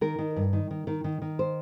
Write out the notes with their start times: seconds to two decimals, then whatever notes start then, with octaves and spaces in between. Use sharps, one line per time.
0.01 D#3 A#4
0.19 D#3
0.36 G2
0.53 D#3
0.71 D#3
0.87 D#3
1.04 D#3
1.22 D#3
1.39 C5